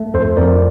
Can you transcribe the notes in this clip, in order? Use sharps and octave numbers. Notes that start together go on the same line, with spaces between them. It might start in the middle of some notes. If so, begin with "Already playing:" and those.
Already playing: A3
F2 A4 C5
F2 A#4 D5